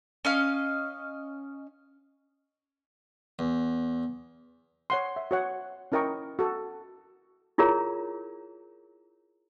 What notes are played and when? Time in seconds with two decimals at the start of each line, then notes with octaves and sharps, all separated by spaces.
0.25 C#4 D#5 F5
3.39 E2
4.90 C#5 F#5 C6
5.16 E5
5.31 F#4 C#5 F#5
5.92 C#4 E4 A#4 D#5 G5 C#6
6.39 F#4 A4
7.58 E4 F4 G#4 A#4 C#5 A#5